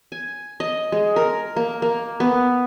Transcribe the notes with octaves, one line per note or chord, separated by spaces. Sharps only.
G#5
D#5
G#3
A#4
A#3
A#3
B3